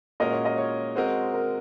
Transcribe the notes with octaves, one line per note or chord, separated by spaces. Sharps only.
A#2 G#3 C#4 F#4 A#4 D#5
C#5
D#5
C#5
G#3 C4 F#4 A#4 C5 D#5
A#4